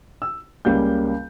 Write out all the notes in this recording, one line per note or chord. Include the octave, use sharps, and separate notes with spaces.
E6
C#2 C#3 G3 A#3 G6